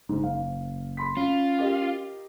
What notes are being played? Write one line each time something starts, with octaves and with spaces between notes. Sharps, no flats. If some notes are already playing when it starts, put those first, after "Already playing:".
F#1 G#2
F5
B5 C6 B6
C#4 F4
G4 A#4 D#5